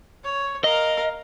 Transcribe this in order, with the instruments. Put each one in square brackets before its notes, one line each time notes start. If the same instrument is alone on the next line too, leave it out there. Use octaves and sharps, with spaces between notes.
[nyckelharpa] C#5
[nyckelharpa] A#4 F5 [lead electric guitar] D#5